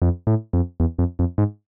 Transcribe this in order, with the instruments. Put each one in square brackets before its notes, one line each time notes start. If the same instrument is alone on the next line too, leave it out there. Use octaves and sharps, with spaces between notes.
[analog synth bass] F2
A2
F2
E2
F2
F2
G#2